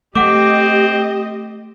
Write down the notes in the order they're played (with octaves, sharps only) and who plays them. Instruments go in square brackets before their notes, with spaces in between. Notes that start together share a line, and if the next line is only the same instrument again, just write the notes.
[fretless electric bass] A3 [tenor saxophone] C4 [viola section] G4 D#5 [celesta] F#5 D6